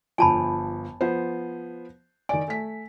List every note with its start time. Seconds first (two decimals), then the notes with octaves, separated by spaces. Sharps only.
0.18 G1 F3 G#5 A5 B5
1.01 F3 B3 C5
2.29 D#3 D5 G#5
2.48 A3 B6